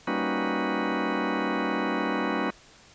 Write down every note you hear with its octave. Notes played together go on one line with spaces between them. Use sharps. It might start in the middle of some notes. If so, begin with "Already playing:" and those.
G3 A#3 C#4 D#4 F#4 B4